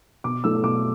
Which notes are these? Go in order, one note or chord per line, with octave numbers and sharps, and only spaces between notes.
B2 D6
A3 E4 E6
B2 D6